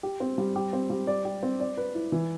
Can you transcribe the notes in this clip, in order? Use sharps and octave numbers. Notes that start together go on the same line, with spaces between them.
G4
C4
G3
G4
C4
G3
D5
G4
C4
D5
B4
E4
E3